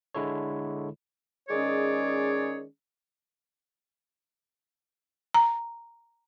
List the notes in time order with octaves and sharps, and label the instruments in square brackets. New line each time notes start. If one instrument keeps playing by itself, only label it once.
[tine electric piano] D3 G#3 E4 A4 C#5
[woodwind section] D#3 G#3 C#4 G#4 C#5 D5
[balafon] A#5